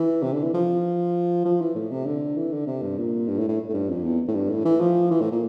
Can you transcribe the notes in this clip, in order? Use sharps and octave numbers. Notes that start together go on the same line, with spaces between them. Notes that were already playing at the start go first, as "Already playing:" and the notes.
Already playing: E3
C3
D3
E3
F3
F3
E3
A2
C3
D3
E3
D3
C3
G2
A#2
G2
A2
A2
A2
G2
F2
E2
A2
G2
A2
E3
F3
E3
A2
A#2